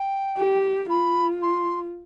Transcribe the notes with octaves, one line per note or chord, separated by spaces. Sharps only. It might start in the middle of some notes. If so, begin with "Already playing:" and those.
Already playing: G5
G4
F4 B5
C6